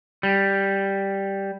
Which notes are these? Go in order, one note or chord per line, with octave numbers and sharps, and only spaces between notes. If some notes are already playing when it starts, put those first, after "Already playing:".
G3